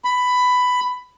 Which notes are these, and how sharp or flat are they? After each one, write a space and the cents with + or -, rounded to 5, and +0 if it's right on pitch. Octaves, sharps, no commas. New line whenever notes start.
B5 +10